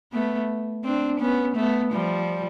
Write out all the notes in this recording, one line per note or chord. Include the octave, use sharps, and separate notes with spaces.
A3 B3
C4 D4
B3 C#4
A3 B3
F3 G3